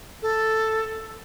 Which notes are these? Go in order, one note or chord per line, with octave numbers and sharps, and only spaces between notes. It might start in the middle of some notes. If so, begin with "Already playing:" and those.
A4